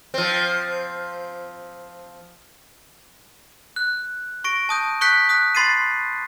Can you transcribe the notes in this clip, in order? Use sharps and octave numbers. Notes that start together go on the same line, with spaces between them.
F3 C4
F#6
C#6 A#6 D7
A5 D#6 G6
C#6 D#6 F#6 G6 B6 C#7
D#6 F#6 B6
B5 C6 A6 C7 D#7